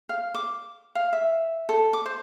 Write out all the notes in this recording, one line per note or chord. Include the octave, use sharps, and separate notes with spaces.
F5
D6
F5
E5
A4
D6
C5